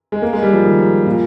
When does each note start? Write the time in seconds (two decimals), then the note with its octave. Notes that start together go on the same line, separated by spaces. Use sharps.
0.12 G#3
0.22 A#3
0.33 G#3
0.43 G3
0.53 F3
0.64 D#3
1.06 A#2